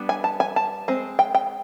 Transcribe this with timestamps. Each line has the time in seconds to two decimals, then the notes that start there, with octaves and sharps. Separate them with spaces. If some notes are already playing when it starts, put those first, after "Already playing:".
Already playing: G3 B3 D4
0.09 G#5
0.24 A5
0.40 G#5
0.56 A5
0.88 G#3 C4
1.19 G5
1.35 G5